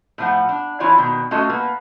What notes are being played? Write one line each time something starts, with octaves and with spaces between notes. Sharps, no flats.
A2 F3 F#5
D4
E3 E4 F4 C#5 D5
B2 D#3
A3 C#4 F4 F#4 A4 D#5
A#3 B3 B4